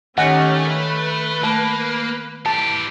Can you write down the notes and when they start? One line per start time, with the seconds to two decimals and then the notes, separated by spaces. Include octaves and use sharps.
0.18 D#3 A3 C#4 D#4 G4 F#5 G#5 A#6
0.70 B4
1.43 A3 A#3
2.46 E3 G4 A5